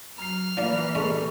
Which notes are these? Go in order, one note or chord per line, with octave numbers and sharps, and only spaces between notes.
F#3 A#5 F6 C7
E3 F3 A#3 D4 D5
G3 G#3 D4 A4 C#6